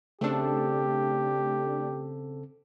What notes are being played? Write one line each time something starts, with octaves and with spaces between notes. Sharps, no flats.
C#3 A3 C4 D4 G4 A4